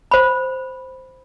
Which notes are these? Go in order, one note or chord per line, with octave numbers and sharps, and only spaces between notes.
C5 B5